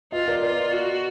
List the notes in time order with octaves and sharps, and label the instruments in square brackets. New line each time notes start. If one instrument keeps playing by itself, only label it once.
[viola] F4 [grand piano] B4 D#5
[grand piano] A#4 D5
[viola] F4 [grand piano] A#4 D5
[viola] F#4